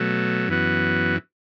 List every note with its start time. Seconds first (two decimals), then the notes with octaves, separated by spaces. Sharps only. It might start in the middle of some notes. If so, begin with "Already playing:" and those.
Already playing: B2 F#3 A3
0.48 F#2 E3 B3 F#4